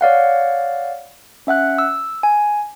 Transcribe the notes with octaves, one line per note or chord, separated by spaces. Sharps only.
C#5 D5 F5 F#5
C#4 E5 F#5 F#6
E6
G#5